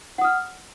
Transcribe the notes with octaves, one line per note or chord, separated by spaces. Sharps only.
F#5 D#6 F6